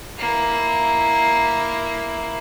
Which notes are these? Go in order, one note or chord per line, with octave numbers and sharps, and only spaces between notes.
A#3 E4